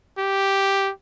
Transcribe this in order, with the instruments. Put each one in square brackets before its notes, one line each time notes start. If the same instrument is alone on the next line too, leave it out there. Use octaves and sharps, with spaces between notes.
[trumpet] G4